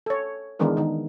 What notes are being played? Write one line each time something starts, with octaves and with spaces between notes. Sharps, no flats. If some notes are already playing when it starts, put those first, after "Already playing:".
A4 C#5
D#3 E3 G#3 B3 D4 A#4
D#3 D#4